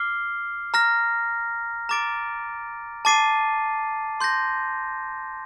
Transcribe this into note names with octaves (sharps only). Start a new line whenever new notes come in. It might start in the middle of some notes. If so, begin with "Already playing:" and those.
Already playing: D6 F6 C7 G7
A#5 F6 A#6
A#5 D6 A6 D7
A5 D6 A6 C7 D#7
C6 G6 A#6